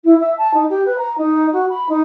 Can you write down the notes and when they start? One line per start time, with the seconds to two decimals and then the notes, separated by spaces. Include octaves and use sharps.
0.04 E4
0.20 E5
0.37 A5
0.53 D#4
0.69 G4
0.85 B4
0.98 A#5
1.18 D#4
1.52 F#4
1.69 B5
1.89 D#4